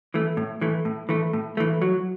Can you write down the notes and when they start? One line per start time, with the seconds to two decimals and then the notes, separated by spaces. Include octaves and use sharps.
0.14 E3 A3
0.37 A2
0.61 E3 A3
0.85 A2
1.09 E3 A3
1.33 A2
1.57 E3 A3
1.82 F#3